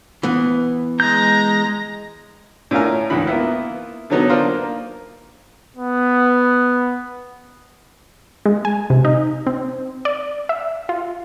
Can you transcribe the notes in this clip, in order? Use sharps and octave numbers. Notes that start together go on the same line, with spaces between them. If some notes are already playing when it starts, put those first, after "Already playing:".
E3 B3
G#3 A#5 G6 A#6
A2 C#4 D4 F4 A#4 G#5
C#2 G#2 E3 D#4 B5
A#3 B3 E4 F4
D3 D#3 F#3 B3 D#4
D4 F4 A#4 C5
A#3
B3
G#3
G#5
C3
D#4
C4
D5
E5
F4